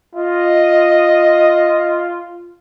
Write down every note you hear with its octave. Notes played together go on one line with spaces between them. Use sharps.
F4 D#5